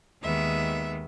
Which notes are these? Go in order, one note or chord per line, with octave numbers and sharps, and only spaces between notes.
D#2 D#3 G#3 B3 E5